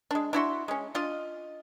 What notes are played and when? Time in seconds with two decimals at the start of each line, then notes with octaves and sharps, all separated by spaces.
0.11 G#3 D4
0.33 D4 E4 F#4 C6
0.68 G#3 C#4
0.95 D4 F4 D#5